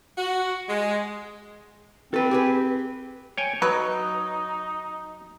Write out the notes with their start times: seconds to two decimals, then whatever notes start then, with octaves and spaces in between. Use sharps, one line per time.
0.17 F#4
0.68 G#3
2.14 C4 A4 B4
2.31 G4 G#4 B4
3.38 C#5 G5 G#5
3.62 F#3 D#4 B4